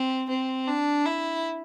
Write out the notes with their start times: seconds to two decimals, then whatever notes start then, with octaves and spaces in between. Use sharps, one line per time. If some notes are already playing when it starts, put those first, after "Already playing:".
Already playing: C4
0.29 C4
0.67 D4
1.05 E4